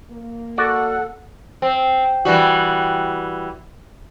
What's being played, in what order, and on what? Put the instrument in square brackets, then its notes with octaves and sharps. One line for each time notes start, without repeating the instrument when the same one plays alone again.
[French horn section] A#3
[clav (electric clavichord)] F#4 D5 [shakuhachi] A4 [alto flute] F#5
[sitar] C4
E3 G3 F#4